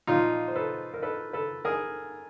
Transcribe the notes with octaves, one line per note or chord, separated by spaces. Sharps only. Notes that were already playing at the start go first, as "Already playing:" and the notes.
A#2 F3 D#4 F4
C5
A4 B4
A#4
A4 B4
A4 B4
G#4 A#4